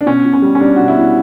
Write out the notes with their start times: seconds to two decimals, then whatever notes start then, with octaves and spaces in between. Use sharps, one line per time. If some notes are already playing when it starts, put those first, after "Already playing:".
0.01 D4
0.06 B2 C#4
0.25 B2
0.33 C#4
0.42 G3
0.55 C#4
0.60 G3 D4
0.76 B2 F#4
0.88 E4
0.96 B2